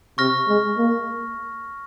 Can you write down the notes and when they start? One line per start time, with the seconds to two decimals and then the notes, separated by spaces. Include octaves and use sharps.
0.18 C3 C#6 F6 A#6
0.48 G#3
0.77 A#3